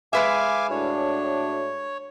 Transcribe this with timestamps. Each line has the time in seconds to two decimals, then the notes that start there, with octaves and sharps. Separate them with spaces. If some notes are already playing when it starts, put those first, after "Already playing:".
0.13 G#3 B4 E5 F5 G#5 D6
0.70 A2 D4 F#4 C#5